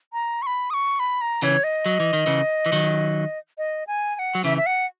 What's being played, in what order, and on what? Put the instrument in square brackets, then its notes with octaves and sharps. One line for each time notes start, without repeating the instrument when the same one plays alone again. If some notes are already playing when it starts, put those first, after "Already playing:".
[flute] A#5
C#6
B5
D#6
C#6
B5
A#5
[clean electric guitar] C#3 E3 [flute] C#5
[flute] D#5
[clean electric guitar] F#3
E3
D#3
C#3 E3
E3
D#3 F#3
[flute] D#5
G#5
G#5
F#5
[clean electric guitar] F#3
[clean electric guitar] C#3 E3 [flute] E5
[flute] E5
F#5